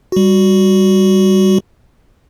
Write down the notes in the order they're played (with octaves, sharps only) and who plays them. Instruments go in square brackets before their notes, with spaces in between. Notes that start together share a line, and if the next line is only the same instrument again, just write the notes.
[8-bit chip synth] G3 F#4